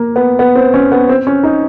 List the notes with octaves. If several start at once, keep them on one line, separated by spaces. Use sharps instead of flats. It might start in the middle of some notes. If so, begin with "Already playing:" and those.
Already playing: A#3
B3
B3
C4
C#4
B3
C4
C#4
D#4